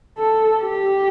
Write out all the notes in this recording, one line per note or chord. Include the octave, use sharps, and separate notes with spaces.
A4
G4